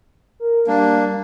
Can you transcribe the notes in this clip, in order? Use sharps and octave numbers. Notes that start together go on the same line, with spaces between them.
A#4
G3 A#3 D4